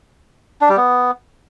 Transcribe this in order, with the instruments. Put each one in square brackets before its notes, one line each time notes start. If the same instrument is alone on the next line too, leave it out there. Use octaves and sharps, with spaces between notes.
[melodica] D4
G3
B3